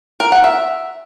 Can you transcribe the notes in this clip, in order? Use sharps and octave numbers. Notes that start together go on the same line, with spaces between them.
A#4
F#5
E5